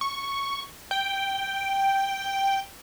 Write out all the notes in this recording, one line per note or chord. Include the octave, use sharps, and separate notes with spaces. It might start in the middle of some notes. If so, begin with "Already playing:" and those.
C#6
G5